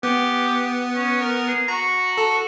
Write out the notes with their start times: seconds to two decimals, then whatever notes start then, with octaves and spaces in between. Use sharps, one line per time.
0.03 B3 G4
0.94 C#4
1.20 A#4
1.48 G#4
1.68 F#4 A#5
2.18 A4